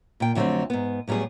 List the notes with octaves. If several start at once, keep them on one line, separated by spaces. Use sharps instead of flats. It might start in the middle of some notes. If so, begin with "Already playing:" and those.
A#2 G5
F2 D3 F#3 G#3 A3 C4
G#2 B3
A2 F#3 G3 B3 G#4